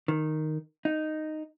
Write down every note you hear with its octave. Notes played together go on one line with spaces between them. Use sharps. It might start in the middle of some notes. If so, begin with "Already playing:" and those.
D#3
D#4